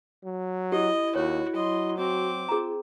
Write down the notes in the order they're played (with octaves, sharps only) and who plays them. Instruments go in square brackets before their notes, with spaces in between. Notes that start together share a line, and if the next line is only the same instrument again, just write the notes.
[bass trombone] F#3
[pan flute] E4 [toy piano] G4 [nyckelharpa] D#5
[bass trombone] D#2 [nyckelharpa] F#4 [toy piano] C#5
[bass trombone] F#3 [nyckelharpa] D#5 C6
[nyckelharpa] C4 D6 [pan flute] F#4
[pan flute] F4 [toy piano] G#4 A#5